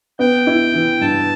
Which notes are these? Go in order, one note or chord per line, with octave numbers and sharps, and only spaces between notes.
B3 G5
E4
E3
G2 A5